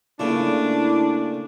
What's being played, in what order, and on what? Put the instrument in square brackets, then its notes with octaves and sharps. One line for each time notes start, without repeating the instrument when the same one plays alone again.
[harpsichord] A#2 C#3 A3 [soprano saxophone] D4 [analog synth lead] E4